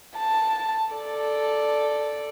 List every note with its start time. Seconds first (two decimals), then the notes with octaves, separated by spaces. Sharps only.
0.17 A5
0.93 A4 D5